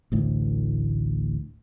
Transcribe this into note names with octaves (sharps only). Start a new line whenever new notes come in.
A1 D2 A2